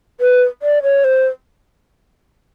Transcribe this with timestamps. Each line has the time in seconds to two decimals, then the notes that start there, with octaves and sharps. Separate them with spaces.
0.20 B4
0.62 D5
0.83 C#5
1.04 C5